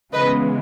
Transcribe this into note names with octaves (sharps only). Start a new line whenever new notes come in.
C#3 E3 G#3 B3 B4 D#5